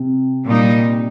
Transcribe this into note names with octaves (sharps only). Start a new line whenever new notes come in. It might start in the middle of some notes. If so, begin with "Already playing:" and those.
Already playing: C3
A#2 G3 D#4